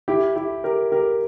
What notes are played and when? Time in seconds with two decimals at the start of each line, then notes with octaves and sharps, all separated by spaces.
0.08 E4 G4
0.36 E4 G4
0.64 G4 A#4
0.92 G4 A#4